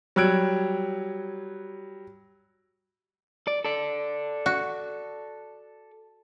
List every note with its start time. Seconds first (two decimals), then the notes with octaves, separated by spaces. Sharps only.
0.16 F#3 G3 E6 F#6 G#6 D7
3.47 D5
3.65 A4 D5
4.46 F#4